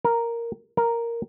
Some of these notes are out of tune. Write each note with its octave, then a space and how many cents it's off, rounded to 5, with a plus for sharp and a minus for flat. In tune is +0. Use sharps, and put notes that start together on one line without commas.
A#4 +0
A#4 +0